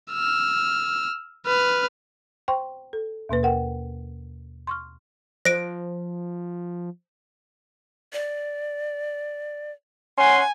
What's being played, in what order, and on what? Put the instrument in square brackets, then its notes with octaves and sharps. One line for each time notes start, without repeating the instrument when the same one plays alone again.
[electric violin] E6 F6
B4 F6
[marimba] C5 G5 C6 C#6
A4
D#2 B2 A#3 B4
A#4 F#5 G5
C6 C#6 F6
[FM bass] F3 [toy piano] C5 [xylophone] A#6 D7
[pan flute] D5
[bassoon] C#4 [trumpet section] F#5 C6 [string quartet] G#5